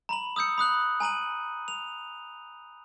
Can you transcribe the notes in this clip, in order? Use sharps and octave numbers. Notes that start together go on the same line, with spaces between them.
A#5 B5 F#7
D#6 E6 G6 C#7
B5 D#6 F#6 F#7
G#5 A#5 D#7 F#7
F7